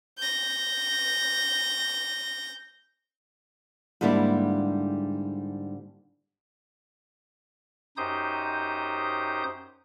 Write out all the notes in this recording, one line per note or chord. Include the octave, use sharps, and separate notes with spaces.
G6 A#6
G#2 D3 G3 A#3 D4 E4
F#2 D#4 G4 C5 D#6 G6